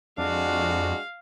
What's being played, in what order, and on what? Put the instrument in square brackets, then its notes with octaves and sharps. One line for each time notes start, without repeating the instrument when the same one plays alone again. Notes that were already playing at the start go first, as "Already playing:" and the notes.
[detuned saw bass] F2 [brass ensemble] G#3 F#4 [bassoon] D4 [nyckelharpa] F5